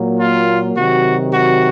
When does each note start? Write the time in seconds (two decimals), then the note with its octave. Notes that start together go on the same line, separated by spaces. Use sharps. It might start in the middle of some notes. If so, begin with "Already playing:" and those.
Already playing: A#2 F#3 A#3
0.19 F4
0.76 C3 D#3 F#3 F#4
1.33 F#4